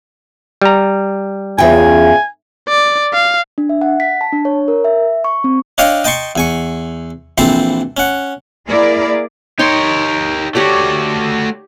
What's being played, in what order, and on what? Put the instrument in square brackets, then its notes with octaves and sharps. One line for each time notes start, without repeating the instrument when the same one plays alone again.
[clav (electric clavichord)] G3 A#5
[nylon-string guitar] E2 G5 [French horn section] C#4 F4 G#4 [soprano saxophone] G#5
[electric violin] D5
F5
[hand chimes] D4
E5
F#5
B6
A5
D4
C#5
A#4
E5
C#6
C4
[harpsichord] D4 C#5 D#5 F5 G5
D#5 G5 A5 C6 C#6
E2 G#5 C#6
A#1 E3 C4 A4 C5 C6
C#4 F#5
[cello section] A#3 E4 G#4 A#4 D5
[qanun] D#4 C#5 C6 [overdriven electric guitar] G4 A#4
[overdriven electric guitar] A3 F#4 [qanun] G4 C#5 D5